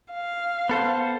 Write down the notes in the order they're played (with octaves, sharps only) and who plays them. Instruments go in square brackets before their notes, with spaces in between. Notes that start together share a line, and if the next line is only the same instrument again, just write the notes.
[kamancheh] F5
[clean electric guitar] B3 A4 C5